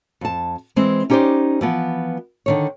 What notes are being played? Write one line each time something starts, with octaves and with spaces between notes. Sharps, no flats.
F2 A5
E3 G#3 C4
C#4 D#4 G4 B4 C5 D5
E3 F3 B3
D3 D#3 C#5